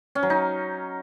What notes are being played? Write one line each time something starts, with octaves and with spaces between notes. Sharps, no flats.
C#4
F#3
D#4